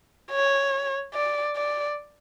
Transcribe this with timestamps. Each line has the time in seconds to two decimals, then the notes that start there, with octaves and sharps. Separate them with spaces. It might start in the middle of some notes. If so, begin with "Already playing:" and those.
0.31 C#5
1.14 D5
1.56 D5